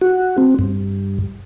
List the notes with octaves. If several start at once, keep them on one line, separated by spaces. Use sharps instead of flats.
F#4
C4
G2